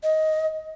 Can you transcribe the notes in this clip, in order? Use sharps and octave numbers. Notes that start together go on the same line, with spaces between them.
D#5